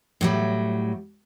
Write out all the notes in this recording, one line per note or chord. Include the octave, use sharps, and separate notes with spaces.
A2 F#3 G3